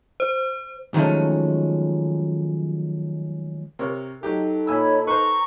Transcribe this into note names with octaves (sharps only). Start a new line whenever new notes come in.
C5
D#3 F3 F#3 G#3 A3 C#4
C3 A#4 C#5
F#3 D#4 G4 A4
A#2 C#5 G#5 B5 E6
B4 C5 A#5 C#6